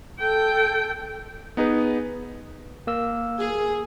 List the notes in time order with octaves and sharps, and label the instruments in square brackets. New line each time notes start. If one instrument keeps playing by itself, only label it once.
[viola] A4 G5
[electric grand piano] B3 D#4 G#4 B4
[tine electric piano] A#3 E6
[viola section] G#4